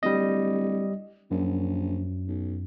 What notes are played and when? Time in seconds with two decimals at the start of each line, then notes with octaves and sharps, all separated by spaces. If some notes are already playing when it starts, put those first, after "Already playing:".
0.03 D1 G3 D#5
1.31 A#1 F#2
2.27 B1